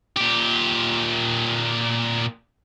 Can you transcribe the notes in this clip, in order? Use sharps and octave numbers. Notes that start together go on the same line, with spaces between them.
A#2 G4